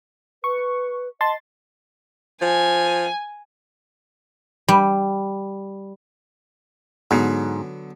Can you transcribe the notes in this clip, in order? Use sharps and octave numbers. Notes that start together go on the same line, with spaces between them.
B4 C#6
D#5 A5 C6 A6
F3 G#5
G3
G#2 D3 F#3 B3